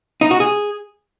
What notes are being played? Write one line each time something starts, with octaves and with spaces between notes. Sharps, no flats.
D#4
F#4
G#4